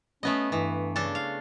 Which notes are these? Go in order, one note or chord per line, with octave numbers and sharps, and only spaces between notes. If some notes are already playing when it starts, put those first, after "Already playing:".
A3 B3 C#4 D#5
G2 E3
C#3 D4 A4
F5